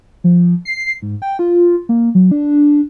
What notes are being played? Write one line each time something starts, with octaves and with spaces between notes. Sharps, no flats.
F3
C7
G#2
G5
F4
A#3
F#3
D4